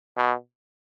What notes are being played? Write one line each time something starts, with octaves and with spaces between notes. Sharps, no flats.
B2